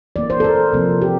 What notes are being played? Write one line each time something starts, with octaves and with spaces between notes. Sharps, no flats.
E3 A#3 D5
C5
A4
A#4
C3 F3 A#3
G4